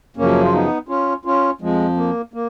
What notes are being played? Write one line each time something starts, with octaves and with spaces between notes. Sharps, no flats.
F#2 C#3 F3 A#3 C#4
F4
B3 D#4
C#4 F4
C#4 F4
F2 F3 G#3
A#3
A#3